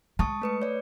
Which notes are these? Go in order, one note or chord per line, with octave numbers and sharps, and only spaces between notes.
G#3 A5 C#6 D#6
A3 B4 C#7
C#5 D5